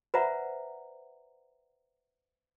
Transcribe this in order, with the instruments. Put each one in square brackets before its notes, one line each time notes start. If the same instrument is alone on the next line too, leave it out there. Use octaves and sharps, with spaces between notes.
[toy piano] B4 C5 D5 E5 F#5 A#5